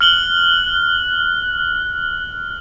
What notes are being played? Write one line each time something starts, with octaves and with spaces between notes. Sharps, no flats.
F6 F#6 F#7 G7